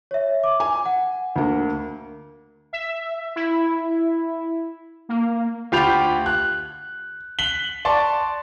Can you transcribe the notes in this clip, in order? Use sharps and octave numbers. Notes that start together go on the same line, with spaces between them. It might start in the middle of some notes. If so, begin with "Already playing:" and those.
C#5 E5
D6
G#5
F#5
D2 A#3
E5
E4
A#3
D2 F4 G4 B5 G6 F7
F#6
F#6 B6 F#7 G7
D5 A5 C6 C#6